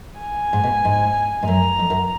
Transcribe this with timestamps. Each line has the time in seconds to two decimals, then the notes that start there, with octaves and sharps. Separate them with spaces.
0.21 G#5
0.53 G#2
0.64 B2
0.85 G#2
1.43 G#2
1.48 F#2 A#5
1.79 F2
1.90 F#2